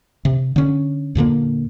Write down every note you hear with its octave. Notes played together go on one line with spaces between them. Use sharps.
C3
D3 C#4
E2 A#2 D3 A#3